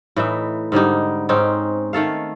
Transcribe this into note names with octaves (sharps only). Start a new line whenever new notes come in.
A2 E3 D#4 E5
G#2 D3 G3 D#4
G#2 C4 C#4 D#4
D#3 A3 A4 F5